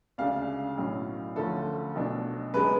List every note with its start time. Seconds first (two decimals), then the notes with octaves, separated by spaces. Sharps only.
0.18 D2 C#3 G#3 D4 F5
0.77 B1 A2 F#3 C#4
1.36 D2 D3 F3 A3 C#4 A4
1.95 B1 B2 A3 D4
2.54 F#2 C#3 G#3 B4